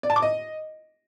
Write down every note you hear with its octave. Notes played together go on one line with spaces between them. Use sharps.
D5
A5
D6
D#5